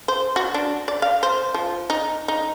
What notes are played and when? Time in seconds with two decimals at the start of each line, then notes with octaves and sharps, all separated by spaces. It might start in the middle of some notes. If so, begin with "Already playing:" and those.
0.08 C5
0.36 F#4
0.54 D4
0.88 D5
1.02 F5
1.23 C5
1.54 F3
1.90 D#4
2.28 D#4